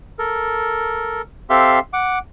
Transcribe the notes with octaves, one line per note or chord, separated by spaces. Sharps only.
A4 A#4
C4 G4 A4 E5 F5 C6
F#5 D6